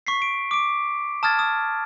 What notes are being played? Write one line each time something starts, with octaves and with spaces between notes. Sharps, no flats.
C#6 B6 C7
D7
D6 D7
A5 D#6 F6 G#6 A6
D#6